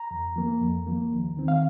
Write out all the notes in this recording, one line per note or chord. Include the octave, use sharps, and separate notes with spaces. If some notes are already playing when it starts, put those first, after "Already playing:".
Already playing: A#5
F2
F3 A#3
F2
F3 A#3
D#2
D#3 C4
F5